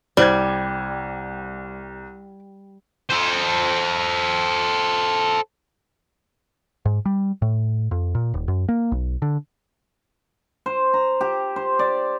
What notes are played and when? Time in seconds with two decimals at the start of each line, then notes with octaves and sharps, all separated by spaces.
0.17 C2 G3 C5 D5 G#6
3.10 A4 C5
6.85 G#2
7.06 G3
7.42 A2
7.91 F2
8.15 A#2
8.34 D#1
8.48 F#2
8.69 A#3
8.92 B1
9.22 D3
10.66 C5
10.94 A#5
11.21 G4
11.56 C5
11.79 D5